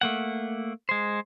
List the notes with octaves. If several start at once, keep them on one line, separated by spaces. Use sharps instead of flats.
A3 A#3 F#5
G#3 C5